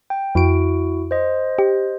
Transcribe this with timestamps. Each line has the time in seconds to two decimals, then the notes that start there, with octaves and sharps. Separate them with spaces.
0.10 G5
0.35 F2 E4 F#4 D7
1.11 C5 D#5
1.59 G4